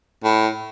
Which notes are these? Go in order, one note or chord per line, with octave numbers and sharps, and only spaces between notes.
A2